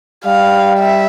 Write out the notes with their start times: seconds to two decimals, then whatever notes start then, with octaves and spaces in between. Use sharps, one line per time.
0.25 G3 F5
0.79 E5